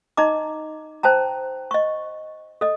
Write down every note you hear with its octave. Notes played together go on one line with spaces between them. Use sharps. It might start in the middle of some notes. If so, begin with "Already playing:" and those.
D#4 D#5 A#5 D6
C5 G5 A5 A#5
D#5 C#6
A4 D#5